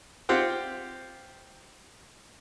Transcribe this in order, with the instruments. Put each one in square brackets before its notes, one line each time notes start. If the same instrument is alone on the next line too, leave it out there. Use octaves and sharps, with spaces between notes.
[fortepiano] C4 F4 G4 F#5